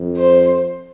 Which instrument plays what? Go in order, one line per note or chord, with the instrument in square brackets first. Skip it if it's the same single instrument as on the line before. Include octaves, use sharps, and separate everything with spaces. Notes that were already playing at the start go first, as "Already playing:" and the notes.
Already playing: [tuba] F2
[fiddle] C5